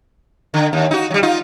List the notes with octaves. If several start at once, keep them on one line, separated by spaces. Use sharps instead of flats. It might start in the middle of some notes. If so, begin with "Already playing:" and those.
D3
D#2
D#4 F#4
F#3 G3
D#4 F4